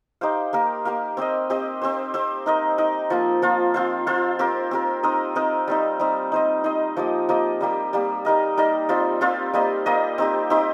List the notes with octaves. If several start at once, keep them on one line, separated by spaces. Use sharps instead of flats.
D#4 G4 C5 F5
A#3 G4 A#4 F5
A#3 G4 A#4 F5
C4 G4 C5 D#5
C4 G4 C5 D#5
C4 G4 C5
C4 G4 C5
D#4 A#4 D#5
D#4 A#4 D#5
F3 A#3 F4
F3 A#3 F4
C4 F4 C5 F5
C4 F4 C5 F5
C4 G4 A#4
C4 G4 A#4
C4 D#4 A#4 D#5
C4 D#4 A#4 D#5
G3 C4 D#4
G3 C4 D#4
D#4 C5 D#5
D#4 C5 D#5
F3 A#3 G4 D#5
F3 A#3 G4 D#5
G3 A#3 G4
G3 A#3 G4
G3 D#4 A#4 D#5
G3 D#4 A#4 D#5
G3 C4 F4 C5
G3 C4 F4 C5
G3 A#3 G4 D#5
G3 A#3 G4 D#5
C4 D#4 G4
C4 D#4 G4